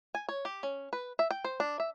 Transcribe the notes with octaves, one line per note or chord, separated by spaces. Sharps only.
G#5
C#5
G4
C#4
B4
E5
G5
C5
D4
E5